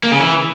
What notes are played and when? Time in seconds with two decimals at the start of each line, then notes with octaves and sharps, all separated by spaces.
0.03 A#3
0.12 C#3
0.20 E3